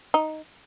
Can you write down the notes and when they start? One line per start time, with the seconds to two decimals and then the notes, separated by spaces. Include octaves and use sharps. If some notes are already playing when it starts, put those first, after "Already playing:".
0.14 D#4